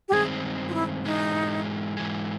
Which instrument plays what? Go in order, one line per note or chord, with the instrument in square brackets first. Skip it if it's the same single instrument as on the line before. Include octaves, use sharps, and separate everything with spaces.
[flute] G4
[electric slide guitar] G2 D#3 G#3 C4 [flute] G#4
[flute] F4
E4
[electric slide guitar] G#2 E3 G#3 [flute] D#4
[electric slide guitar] G#2 E3 G#3